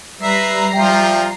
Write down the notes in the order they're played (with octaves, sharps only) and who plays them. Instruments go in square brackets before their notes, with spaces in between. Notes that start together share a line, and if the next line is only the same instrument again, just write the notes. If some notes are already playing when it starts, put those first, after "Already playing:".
[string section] G3 A#5 C7 [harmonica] B4 E5
[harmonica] F3 F4 [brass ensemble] D5 E5 G5